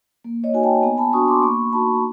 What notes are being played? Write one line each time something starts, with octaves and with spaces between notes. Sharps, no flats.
A#3
C#5 D#5
D#4 F#4 G#5
G5 A5
B3 G#5 A#5
A5 B5
D4 F#4 C#6 D#6
C6 D6
A#3 B5 C#6
D#4 F#4 A5 B5
A#5